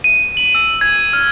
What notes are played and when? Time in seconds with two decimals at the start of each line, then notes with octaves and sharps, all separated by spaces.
0.04 D#7
0.37 F#7
0.55 E6
0.81 G#6
1.13 F6